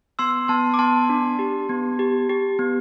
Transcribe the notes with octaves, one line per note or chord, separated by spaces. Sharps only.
B3 C6 E6
B3 A5 C6
D6
B3 A5 C6
D4
G4
B3
G4
G4
B3